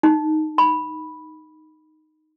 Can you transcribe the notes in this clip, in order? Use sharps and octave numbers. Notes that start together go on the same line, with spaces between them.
D#4
B5